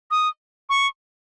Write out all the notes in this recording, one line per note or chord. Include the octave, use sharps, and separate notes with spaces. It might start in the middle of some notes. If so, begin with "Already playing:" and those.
D#6
C#6